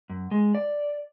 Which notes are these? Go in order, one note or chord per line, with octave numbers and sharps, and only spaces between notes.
F#2
G#3
D5